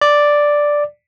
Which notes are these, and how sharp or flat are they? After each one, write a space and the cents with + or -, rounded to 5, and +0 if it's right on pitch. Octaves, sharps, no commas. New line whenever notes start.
D5 +0